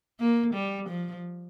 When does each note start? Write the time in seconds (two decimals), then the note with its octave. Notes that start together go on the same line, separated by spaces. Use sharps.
0.20 A#3
0.54 G3
0.89 F3